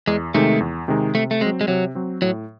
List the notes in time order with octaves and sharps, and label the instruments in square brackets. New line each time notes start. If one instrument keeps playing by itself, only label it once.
[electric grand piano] E2 [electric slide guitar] G#3
[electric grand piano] C3 D#3 G#3 D#4 [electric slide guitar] A3
[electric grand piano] E2
C3 D#3 G#3 D#4
[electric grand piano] C3 [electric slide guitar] A3
[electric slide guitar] A3
[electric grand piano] F#3 C4 [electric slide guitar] G#3
[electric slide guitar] G#3
[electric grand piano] C3 [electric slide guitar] F#3
[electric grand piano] F#3 C4
[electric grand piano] A2 [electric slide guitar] F#3